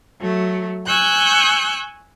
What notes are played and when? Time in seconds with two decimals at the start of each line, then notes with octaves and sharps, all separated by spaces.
0.20 F#3 A3
0.87 G#5 C#6 E6 F#6 G6